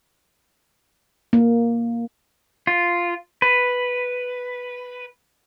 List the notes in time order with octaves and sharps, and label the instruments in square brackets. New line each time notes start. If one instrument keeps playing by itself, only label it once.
[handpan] A#3
[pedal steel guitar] F4
B4